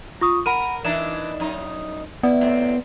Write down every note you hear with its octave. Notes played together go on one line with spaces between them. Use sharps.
F4 C#6 D#6
A#4 F#5 B5 D#7
E3 D4 D#4 E7
F#2 D#4
B3 E4 D5
A2 C4